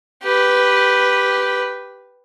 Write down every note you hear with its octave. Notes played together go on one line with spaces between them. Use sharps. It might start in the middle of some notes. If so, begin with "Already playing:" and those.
G4 B4